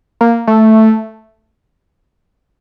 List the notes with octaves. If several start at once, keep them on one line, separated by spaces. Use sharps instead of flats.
A#3
A3